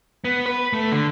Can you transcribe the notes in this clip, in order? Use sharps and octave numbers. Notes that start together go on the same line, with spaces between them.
B3
B4
A3
D3